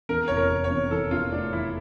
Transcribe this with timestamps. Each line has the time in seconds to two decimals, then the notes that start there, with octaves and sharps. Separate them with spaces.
0.09 E2 A#4
0.28 F1 C#5
0.37 A#4
0.50 F1
0.64 C#5
0.71 E2
0.91 E3 A4
1.11 E2 F4
1.32 A3 D4
1.52 E3 E4